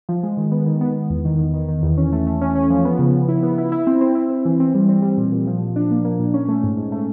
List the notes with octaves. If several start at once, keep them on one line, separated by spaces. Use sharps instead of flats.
F3
G#3
D#3
B3
D#3
B3
B3
E2
D#3
D#3
D#3
D#3
E2
C#4
A3
A3
C#4
C#4
F3
B3
C#3
C#3
E4
B3
E4
E4
C4
C4
E4
C4
E3
C4
G3
C4
G3
A#2
A#2
F3
A#2
D4
A#3
A#3
A#2
C#4
A3
G#2
G#2
A3